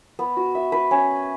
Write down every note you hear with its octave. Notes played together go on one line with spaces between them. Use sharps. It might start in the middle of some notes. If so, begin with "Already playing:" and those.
B3
F#4
E5
B4
C#4